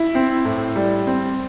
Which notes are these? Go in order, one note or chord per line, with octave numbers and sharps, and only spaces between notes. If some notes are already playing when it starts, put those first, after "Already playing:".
Already playing: E4
C4
A2
G3
C4